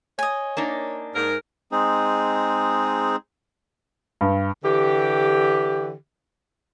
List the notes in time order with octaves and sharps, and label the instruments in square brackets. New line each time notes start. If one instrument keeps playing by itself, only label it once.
[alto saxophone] C#5 [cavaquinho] D#5 G#5
[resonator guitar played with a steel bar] A#3 D4 D#4
[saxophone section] G#2 A#4
[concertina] G#3 C4 D#4 G#4
[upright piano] G2
[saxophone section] D3 E3 G4